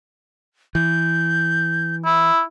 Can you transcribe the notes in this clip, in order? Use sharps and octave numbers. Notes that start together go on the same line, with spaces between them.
E3 G6
E4